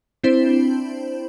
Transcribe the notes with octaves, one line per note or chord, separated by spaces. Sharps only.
C4 D4 E4 C5